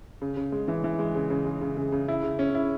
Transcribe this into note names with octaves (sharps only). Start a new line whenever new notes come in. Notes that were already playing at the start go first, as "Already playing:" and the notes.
C#3
C#3
G#3
E3
E3
G#3
C#3
C#3
G#3
C#3
C#3
C#3
E4
C#3
C#4
E4